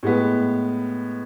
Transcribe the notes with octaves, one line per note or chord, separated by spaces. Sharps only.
A2 G#3 B3